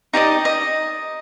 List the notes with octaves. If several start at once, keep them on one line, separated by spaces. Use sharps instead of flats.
D#4 G4 D5 D#5
D#5